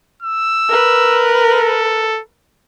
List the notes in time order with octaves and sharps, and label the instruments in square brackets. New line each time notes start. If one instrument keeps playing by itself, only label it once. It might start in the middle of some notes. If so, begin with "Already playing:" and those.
[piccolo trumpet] E6
[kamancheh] A#4 B4
[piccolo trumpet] A4